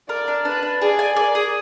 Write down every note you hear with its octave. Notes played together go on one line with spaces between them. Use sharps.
A#4 D5
D4
D4 B4
D4
G#4 D5
G#5
A#4 D5
G#4